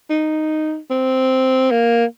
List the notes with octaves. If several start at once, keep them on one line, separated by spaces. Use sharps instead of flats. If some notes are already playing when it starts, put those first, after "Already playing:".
D#4
C4
A#3